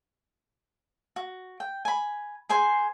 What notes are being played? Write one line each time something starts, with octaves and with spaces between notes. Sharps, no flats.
F#4
G5
G#5 B5
G#4 C5 G#5 C6